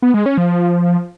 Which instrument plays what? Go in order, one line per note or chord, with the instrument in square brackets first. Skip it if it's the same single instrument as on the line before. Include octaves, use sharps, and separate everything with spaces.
[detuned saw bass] B3
G#3
C#4
F3